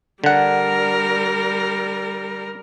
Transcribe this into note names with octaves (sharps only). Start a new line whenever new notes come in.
D3 G3 A#4 F#5